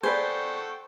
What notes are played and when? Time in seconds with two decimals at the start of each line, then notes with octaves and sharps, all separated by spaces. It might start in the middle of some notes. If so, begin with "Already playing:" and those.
0.03 G#4 A4 B4 C5 D5 F#5 G5 C#6